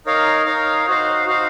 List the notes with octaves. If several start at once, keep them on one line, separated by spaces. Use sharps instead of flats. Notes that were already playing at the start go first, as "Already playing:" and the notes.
D#4 A#4 C#5 F5
D#4 A#4 C#5 F5
D#4 F#4 C5 F5
D#4 F#4 C5 F5